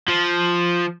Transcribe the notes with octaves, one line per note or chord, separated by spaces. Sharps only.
F3